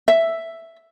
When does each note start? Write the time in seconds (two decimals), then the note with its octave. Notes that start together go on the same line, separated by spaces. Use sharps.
0.08 E5